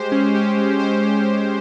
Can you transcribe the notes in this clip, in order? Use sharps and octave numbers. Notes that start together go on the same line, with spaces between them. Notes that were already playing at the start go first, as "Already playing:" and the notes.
Already playing: G#3 G4 C5
C#4
G4
G#3
C5
C#4
G4